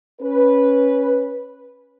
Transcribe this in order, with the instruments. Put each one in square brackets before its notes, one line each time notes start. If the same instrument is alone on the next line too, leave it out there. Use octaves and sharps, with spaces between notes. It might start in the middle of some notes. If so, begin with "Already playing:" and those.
[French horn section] C#4 B4